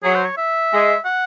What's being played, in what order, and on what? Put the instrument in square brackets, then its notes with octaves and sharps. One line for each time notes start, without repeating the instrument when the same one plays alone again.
[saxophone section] F#3 [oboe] G#4
[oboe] C5
C#5
E5
[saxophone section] G#3
[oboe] F#5